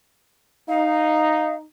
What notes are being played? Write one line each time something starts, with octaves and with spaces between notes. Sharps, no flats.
D#4 F5